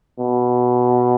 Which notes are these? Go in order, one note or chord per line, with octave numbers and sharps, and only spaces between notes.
B2